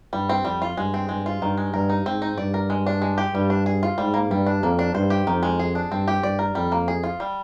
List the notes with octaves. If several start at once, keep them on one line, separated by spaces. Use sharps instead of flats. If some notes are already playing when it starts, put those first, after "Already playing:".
G2 G3
C4
F2 G3
F4
G2 G#3
C4
G2 G#3
F4
G2 D#3
G#3
G2 A#4
D#4
G#2 C4
D#4
G2 D5
A#4
G#3
D4
G#3
G4
G2 G3
D4
G#4
F4
G#2 G3
A#3
G2 G3
D4
F2 A#3
D4
G2 C5
G4
F2 D#3
G#3
G#4
D4
G2 C4
G4
G2 D5
A#4
F2 G3
A#3
G#4
F4
G3